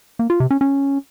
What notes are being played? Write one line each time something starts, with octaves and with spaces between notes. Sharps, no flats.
A#3
F4
C3
C#4
C#4